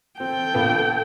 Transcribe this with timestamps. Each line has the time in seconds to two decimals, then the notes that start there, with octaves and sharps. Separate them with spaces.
0.20 C4 A4 G5
0.54 A#1 B3